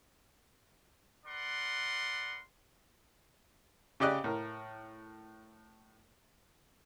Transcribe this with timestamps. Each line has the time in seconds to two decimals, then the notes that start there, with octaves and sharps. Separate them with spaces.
1.26 A#4 B4 D5 F#5 C6
4.00 C#3 G4 D5 D#5 F#6
4.24 A2 A#4